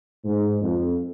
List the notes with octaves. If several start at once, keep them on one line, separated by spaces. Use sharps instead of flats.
G#2
F2